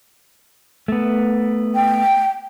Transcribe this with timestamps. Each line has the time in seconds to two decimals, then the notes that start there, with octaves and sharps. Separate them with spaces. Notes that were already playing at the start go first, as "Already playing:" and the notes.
0.88 A3 B3
1.75 G5